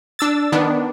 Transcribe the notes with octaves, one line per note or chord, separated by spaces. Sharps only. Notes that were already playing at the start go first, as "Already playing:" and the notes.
D4 E6 A6
D#3 B3 D4